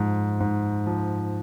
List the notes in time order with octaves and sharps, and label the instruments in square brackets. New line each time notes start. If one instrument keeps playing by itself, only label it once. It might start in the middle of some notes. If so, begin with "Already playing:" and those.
Already playing: [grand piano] G#2 F3
G#2
F3